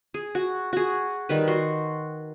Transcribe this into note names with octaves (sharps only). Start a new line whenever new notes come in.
G#4
F#4
F#4 G#4
D#3 G3 B4
F#4 C6